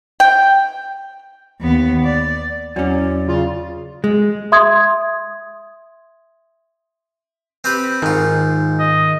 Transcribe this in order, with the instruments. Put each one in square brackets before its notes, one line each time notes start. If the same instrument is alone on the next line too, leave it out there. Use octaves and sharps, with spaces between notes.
[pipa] G5
[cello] D#2 B3
D5
[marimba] E2 C#5 [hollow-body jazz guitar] F#3 C#4 [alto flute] D5
[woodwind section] C#3 F4
[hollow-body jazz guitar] G#3
[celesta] E5 C6 D#6 G#6
[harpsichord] C4 G4 B4
[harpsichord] G#2 F4 [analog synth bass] D#3
[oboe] D#5